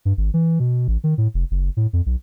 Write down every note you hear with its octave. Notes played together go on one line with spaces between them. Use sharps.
G2
G#1
E3
B2
A1
D#3
A2
F1
F#1
A2
F2
B1